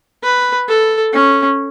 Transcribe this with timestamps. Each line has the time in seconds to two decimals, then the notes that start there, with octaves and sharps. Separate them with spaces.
0.23 B4
0.68 A4
1.13 C#4